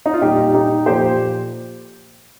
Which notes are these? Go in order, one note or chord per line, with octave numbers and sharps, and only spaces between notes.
D#4
F4
A#2 G3 D#4 G4
D#4 G4
A#2 F3 G4 C5